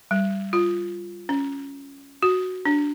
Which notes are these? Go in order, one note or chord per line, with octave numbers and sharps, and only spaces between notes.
G3
F4
C#4
F#4
D4